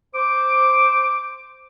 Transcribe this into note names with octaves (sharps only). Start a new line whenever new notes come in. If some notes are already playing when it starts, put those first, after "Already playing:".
C5 D6